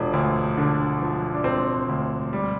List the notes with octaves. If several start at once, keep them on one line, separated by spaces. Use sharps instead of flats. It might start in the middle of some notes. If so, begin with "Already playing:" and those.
Already playing: E1 F3 D4
D2
D3
F3
D4
E1 C4
D2
G3